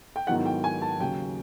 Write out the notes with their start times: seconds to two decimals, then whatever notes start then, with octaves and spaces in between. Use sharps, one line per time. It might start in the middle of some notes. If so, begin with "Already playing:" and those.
0.16 G5
0.27 G#2 D#3 F#3 B3 E4 F#5
0.45 G5
0.64 G#5
0.82 A5
0.99 D#2 C#3 F#3 G5